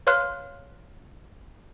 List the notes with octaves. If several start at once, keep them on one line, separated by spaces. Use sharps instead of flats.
B4 C#5 F5 C6 F6 F#6